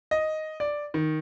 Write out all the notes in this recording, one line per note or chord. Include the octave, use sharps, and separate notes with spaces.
D#5
D5
D#3